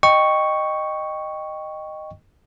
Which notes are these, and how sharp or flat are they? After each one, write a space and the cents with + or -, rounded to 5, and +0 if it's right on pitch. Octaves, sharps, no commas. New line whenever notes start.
D#5 -10 G5 +0 C#6 +0